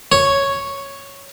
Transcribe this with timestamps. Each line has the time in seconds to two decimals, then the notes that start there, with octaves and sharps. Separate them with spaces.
0.12 C#5